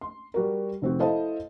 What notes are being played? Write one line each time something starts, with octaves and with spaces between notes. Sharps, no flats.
C6
G3 F#4 A#4
F1 C4 F#4
E4 A4 C5 D#5 F5 A5